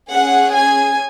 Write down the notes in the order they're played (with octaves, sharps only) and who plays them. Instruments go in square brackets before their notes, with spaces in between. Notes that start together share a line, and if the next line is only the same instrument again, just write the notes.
[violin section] C#4 G#4 F#5
G#5